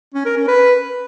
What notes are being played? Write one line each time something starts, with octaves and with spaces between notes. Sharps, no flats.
C#4
A#4
C#4
B4